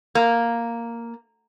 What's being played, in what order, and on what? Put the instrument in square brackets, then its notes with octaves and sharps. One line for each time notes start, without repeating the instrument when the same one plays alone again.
[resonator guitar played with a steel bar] A#3